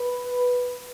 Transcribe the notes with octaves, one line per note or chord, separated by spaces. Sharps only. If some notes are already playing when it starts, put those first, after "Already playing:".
Already playing: B4